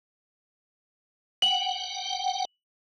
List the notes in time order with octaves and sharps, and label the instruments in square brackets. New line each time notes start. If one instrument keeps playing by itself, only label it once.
[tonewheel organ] F#5 G5 [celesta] F#7